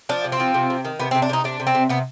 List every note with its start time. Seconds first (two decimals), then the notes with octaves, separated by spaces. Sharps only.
0.09 F3 D4
0.24 C3
0.32 C4
0.40 F3
0.54 C3
0.70 C3
0.85 D#3
1.00 C3 B3
1.11 C4
1.15 C3
1.22 D4
1.29 C3 D#4
1.44 C3 D4
1.60 C3
1.67 C4
1.75 C3
1.89 C3 B3